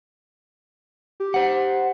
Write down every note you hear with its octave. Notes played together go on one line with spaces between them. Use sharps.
G4
C5 F#5